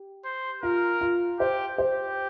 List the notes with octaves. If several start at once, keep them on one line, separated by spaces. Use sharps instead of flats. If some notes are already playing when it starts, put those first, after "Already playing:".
Already playing: G4
C5
F4 A#4
F4
G4 C5
G4 C5